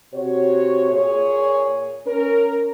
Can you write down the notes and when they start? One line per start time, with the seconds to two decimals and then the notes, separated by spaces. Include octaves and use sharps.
0.14 C3 F#4 C#5
0.91 A#2 G#4 C#5
2.06 C#4 A#4